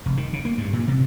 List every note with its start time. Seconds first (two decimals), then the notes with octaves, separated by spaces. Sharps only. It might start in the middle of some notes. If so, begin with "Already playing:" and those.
0.06 F1
0.17 D#3
0.33 C#3
0.45 A#3
0.58 G2
0.73 A#2
0.88 C3